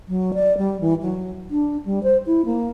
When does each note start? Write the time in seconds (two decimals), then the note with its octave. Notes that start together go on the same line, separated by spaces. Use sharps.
0.08 F#3
0.34 D5
0.58 G3
0.81 E3
1.02 F#3
1.51 D4
1.85 G3
2.03 C5
2.26 E4
2.45 A#3